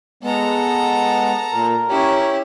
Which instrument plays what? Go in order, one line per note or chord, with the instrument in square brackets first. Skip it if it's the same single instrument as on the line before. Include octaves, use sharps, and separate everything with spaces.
[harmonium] G#3 B3 [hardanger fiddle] A4 A#5
[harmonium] A#2 [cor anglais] A#4
[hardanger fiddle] C#4 E4 [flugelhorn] G4 [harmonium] C#5